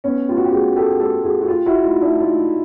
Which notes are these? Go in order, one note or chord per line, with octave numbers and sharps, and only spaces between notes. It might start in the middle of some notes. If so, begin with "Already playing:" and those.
B3 C#4
F4 G4
F#4
G4
F#4 G#4
G4 A4
G4 A4
F#4 G#4
F#4
F4 G4
E4 F#4
D#4 F4
D4 E4
D#4 F4